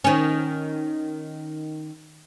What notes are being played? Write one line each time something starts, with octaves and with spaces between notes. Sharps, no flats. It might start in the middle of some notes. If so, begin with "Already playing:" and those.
D#3 C#4